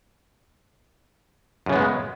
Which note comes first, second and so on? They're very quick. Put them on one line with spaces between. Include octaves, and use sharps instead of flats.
F#2 C#3 B3 G#3